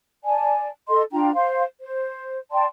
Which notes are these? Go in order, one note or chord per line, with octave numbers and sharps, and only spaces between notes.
D5 G#5 A5
A4 D#5 C6
D4 F4 G5 A#5
C5 F5 C6
C5
D5 G5 A5 C6